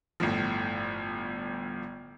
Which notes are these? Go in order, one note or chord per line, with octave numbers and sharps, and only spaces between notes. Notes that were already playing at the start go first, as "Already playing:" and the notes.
G1 A2 F3